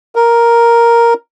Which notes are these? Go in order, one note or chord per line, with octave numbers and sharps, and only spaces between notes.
A#4